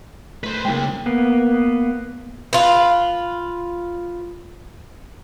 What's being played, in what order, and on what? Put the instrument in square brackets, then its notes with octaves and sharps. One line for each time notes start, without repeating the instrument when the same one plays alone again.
[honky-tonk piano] A3 [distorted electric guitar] B4 C5
[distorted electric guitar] C#3 G#3 [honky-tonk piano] A#3 G5
[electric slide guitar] A#3 B3
[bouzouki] F4 B4